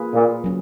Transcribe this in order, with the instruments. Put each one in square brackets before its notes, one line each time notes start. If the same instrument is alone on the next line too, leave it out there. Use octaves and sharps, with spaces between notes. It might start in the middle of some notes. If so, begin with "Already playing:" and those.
Already playing: [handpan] A#3 F4 G#4 B4
[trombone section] A#2
[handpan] F#3 C#4